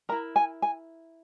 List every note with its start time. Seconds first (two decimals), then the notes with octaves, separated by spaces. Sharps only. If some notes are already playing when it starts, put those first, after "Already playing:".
0.09 A#4 A#5
0.12 E4
0.36 G#5
0.62 G#5